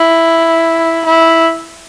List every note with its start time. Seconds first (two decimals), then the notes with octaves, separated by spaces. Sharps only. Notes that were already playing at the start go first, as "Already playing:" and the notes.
Already playing: E4
1.06 E4